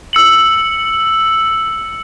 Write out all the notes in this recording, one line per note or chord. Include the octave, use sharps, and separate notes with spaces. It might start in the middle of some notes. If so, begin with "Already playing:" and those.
E6 C#7 F#7